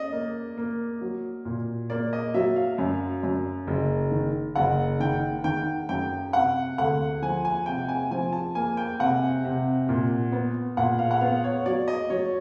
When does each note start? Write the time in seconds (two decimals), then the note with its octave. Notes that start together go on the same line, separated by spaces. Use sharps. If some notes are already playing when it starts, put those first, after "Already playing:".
Already playing: C#4 D5 D#5
0.12 A#3
0.57 A#3
1.01 F#3
1.45 A#2
1.90 A#3 D5
2.13 D#5
2.34 F#3 E5
2.56 F5
2.78 F#2
3.23 F#2
3.67 F#1
4.11 D#3
4.56 F#1 F#5
5.00 D#3 G5
5.44 D#3 G5
5.89 F#2 G5
6.33 C3 F#5
6.78 D2 F#5
7.22 F3 G#5
7.45 G#5
7.66 C3 G5
7.88 G#5
8.11 F3 G#5
8.33 A5
8.55 A#3 G#5
8.77 G5
8.99 C3 F#5
9.45 C3
9.89 A#2
10.32 B3
10.77 A#2 F#5
10.99 F5
11.11 F#5
11.21 B3 F5
11.44 C#5
11.66 F#3 D5
11.88 D#5
12.10 F#3 C#5